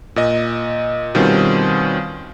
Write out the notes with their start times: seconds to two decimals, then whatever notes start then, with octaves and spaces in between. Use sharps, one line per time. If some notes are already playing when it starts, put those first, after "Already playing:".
0.16 A#2 D#5
1.15 B2 D#3 G3 C4 C#4 F4